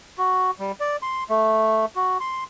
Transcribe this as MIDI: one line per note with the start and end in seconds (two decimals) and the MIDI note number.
0.18 0.51 66
0.59 0.72 55
0.80 0.97 74
1.02 1.24 84
1.29 1.86 57
1.96 2.18 66
2.20 2.44 84